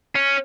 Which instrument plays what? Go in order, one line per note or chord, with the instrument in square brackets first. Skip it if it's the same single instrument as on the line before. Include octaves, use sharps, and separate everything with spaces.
[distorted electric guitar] C#4